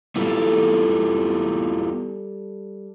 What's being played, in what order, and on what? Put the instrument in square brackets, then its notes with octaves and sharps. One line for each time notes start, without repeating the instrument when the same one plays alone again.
[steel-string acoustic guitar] G3 A4 [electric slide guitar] B3 E4 F4